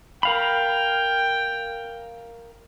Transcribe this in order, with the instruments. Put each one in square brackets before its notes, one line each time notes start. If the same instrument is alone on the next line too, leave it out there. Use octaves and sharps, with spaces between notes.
[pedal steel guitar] A#4 F5 B5 [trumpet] G5